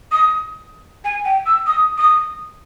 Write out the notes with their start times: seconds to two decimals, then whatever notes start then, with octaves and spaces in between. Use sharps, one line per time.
0.12 D#6
1.04 G#5
1.25 G5
1.46 E6
1.67 D#6
1.98 D#6